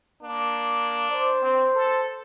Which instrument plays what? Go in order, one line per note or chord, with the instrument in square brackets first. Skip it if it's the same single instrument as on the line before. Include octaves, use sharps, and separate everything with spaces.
[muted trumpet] A#3 [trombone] D4
[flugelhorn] C5 [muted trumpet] D5
[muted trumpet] C4
A4